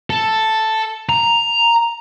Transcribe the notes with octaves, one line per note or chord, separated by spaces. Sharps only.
A4
A#5